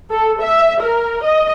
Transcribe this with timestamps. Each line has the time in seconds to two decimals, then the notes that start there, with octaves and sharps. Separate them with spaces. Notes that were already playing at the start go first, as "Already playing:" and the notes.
0.11 A4
0.43 E5
0.82 A#4
1.24 D#5